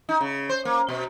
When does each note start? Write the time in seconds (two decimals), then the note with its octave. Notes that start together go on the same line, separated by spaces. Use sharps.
0.09 D#4
0.21 C#3
0.49 C5
0.65 A#3
0.88 B2